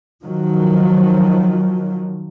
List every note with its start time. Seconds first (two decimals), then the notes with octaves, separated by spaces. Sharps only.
0.23 D#3 F3 F#3